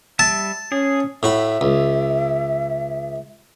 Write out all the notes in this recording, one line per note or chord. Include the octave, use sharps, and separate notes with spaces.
G3 E5 A5
C#4 G#4
A2 F#4 E5 B5
C#2